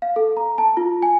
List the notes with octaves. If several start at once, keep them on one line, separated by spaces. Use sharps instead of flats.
F5
A4
A#5
A5
F4
G#5